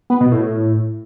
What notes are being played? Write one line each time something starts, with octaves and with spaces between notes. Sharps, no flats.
B3
B2
A2